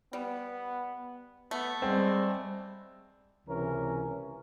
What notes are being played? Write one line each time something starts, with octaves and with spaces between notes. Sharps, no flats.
G3 B3
A3 B3
G3 G#3 C4
C#2 C3 E3 C#4 A#4